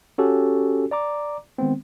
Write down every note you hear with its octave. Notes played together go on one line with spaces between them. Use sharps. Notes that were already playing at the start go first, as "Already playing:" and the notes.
C#4 F#4 G4 A4
D5 A#5 D6
D#3 G#3 B3 C4